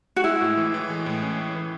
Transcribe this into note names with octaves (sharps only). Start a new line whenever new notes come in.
F#4
G#3 E4
A2
E3
E3
G#3
A2
C#4
C#4
E3